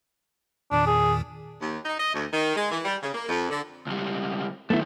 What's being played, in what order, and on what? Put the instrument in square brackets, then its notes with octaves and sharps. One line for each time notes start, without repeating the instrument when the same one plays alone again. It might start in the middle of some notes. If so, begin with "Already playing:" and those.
[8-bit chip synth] E2 A#2 D#3 [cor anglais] D4
[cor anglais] G#4
[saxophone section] D#2
D#4
D#5
D2
D#3
G#3
E3
G3
C#3
A#3
F2
D3
[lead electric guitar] C#2 G3
[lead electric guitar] F#2 D#3 [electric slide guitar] A3 B3 E4